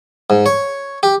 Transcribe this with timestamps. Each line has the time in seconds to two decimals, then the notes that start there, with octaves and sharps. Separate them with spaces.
0.30 G#2
0.46 C#5
1.03 G4